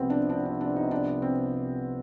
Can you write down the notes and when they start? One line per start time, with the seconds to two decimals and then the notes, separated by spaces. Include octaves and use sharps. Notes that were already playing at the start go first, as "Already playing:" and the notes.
Already playing: C2 C3 F3 B3 C4
0.10 D4
0.29 D4
0.46 D4
0.61 D4
0.76 D#4
0.91 D4
1.22 C4